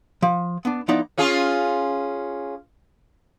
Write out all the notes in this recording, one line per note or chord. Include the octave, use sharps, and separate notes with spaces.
F3
B3 D4
F3 B3 D#4 E4 D5
C#4 F4 G#4